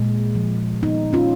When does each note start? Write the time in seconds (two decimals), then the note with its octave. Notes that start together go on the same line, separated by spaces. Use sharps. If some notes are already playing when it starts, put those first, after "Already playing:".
Already playing: A#2 G#3
0.35 F3
0.82 B3 D#4
1.13 C#4 F4